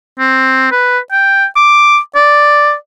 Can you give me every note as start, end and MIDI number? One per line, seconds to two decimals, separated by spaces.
0.19 0.70 60
0.71 0.99 71
1.12 1.45 79
1.56 1.98 86
2.15 2.74 74